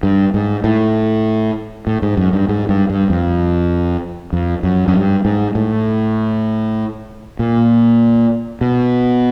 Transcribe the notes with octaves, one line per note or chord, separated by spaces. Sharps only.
G2
G#2
A2
A2
G#2
F#2
G2
G#2
G2
G2
F2
F2
F#2
F#2
G2
G#2
A2
A#2
B2